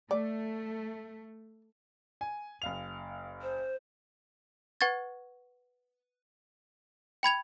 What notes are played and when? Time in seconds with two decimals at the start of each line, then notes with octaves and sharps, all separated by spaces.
0.11 A3 D5
2.21 G#5
2.62 F#1 F5 F7
3.42 C5
4.81 B4 F#5 C#6 G#6 A6
7.23 G5 B5 G#6 F7